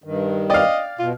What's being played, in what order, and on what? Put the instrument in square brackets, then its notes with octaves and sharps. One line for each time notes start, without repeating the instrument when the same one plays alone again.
[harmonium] G2 D#3
[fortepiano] D5 F5 [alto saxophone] D#5 [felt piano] G5 F6
[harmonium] B2 [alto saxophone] F4